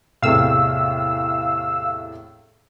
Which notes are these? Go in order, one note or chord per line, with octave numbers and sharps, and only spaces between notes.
E2 A2 C3 F5 E6